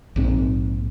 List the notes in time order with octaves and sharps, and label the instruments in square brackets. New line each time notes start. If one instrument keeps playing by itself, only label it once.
[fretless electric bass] A#1 G#2 C4